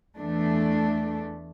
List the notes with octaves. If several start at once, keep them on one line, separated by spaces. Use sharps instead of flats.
E2 E3 A3 D4